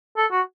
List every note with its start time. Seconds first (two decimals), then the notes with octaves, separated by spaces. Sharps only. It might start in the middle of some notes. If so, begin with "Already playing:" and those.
0.17 A4
0.32 F#4